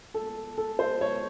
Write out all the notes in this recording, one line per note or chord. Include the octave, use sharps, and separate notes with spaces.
A4
A4
C5
C#5